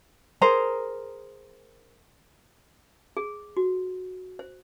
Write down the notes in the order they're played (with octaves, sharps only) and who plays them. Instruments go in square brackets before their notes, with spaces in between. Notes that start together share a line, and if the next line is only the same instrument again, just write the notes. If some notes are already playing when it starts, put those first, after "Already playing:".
[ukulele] G#4 A#4 C5 A#5
[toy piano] G#4
F#4
C5